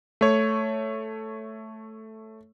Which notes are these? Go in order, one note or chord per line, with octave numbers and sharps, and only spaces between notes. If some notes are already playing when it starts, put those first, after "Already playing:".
A3 C#5